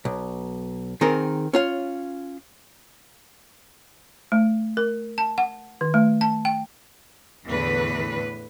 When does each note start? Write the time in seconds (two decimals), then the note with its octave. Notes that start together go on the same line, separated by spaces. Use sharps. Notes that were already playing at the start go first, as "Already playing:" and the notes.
0.05 B1
1.01 D#3 C4 G#4 A#4
1.53 C#4 F4 F5
4.32 A3
4.77 A#4
5.18 A5
5.38 F#5
5.81 D#3
5.94 A3
6.21 A5
6.45 G5
7.48 E2 A2 D3 E3 B4